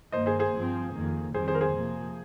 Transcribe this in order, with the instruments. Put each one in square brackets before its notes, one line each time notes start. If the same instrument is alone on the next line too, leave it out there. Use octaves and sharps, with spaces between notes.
[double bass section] G2 D#3 A#3 [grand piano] C5 D#5
[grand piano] G#4 C5
G#4 C5
[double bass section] G2 F3 C4
F2 D#3 A#3
[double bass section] F2 D#3 G3 C4 [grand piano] G#4 C5
[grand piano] G#4 C5
A#4
G#4 C5
[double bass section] C3 F3 A#3